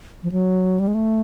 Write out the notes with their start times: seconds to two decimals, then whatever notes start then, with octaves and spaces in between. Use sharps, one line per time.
0.23 F3
0.32 F#3
0.79 G3
0.88 G#3
0.94 A3